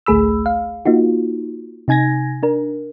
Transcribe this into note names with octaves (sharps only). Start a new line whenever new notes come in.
A1 D2 A3 G#4 B5 E6
F5
A#3 D#4 F4 F#4
C3 D#4 G#5 G#6 A#6
D4 A#4